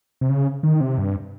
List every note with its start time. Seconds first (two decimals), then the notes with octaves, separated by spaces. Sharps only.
0.21 C3
0.29 C#3
0.63 D#3
0.81 C3
0.98 G2